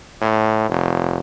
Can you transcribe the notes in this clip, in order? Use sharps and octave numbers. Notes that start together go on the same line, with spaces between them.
A2
F1